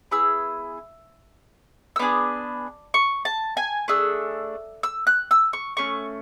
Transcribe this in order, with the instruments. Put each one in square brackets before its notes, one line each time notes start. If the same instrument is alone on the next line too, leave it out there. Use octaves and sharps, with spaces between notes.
[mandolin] B3 E4 G#4 E6
E6
B3 D4 G#4 D6
C#6
A5
G#5
A3 D4 G#4 E6
E6
F#6
E6
C#6
A3 C#4 C#6